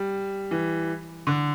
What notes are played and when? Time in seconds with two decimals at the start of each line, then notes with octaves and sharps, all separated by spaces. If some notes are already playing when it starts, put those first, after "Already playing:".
Already playing: G3
0.51 E3
1.27 D3